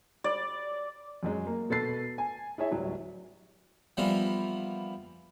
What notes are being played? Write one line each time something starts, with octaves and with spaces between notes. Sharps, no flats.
D5
F#2 F#3 G#3
A#3
B2 A4 B4 A6 C7
G#5
E4 G#4 C#5 E5
D1 F#3 G3
E3 F3 G3 A#3 B3 F4